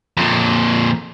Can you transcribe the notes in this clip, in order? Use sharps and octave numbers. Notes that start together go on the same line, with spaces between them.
F2 A#2